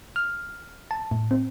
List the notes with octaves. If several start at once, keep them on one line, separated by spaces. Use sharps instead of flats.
F6
A5
A2
C4